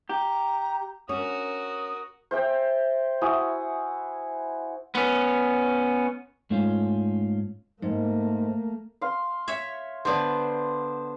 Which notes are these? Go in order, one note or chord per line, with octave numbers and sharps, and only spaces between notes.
G4 A#5
C#4 F#4 A#4 D#6
C5 E5 G5
E4 F#4 G#5 D#6
B3 C#4
G#2 A3 C#4 F4
G#2 A3 A#3
F5 C6
C#5 E5
D3 B3 C5 D5 A5